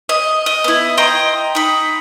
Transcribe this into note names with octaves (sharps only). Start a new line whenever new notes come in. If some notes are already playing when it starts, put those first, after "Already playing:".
D#5
D#5
B3 E4
D#5 G5 A#5 C6
D#4 B5